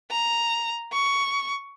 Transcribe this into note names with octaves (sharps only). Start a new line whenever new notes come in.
A#5
C#6